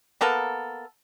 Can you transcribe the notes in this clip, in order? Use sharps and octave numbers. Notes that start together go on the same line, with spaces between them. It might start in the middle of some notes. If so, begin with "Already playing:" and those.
A#3 B3 A4 A#4